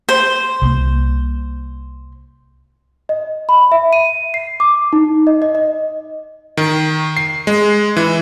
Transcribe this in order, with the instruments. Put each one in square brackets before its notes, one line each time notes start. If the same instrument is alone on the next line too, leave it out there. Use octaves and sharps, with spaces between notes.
[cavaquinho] C5
[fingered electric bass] C2 A#3
[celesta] D#5
B5
E5
D#7
C7
D6
D#4
D#5
D#5
D#5
[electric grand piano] D#3
C7
G#3
E3